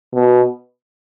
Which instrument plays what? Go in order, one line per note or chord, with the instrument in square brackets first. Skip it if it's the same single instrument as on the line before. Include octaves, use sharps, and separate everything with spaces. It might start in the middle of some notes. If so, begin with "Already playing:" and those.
[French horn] B2